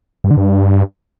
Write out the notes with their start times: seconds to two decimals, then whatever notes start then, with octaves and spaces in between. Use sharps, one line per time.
0.24 G2
0.31 D3
0.37 G2